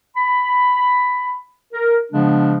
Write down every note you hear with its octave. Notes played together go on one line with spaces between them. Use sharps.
B5
A#4
C#3 F3 G#3 B3 D4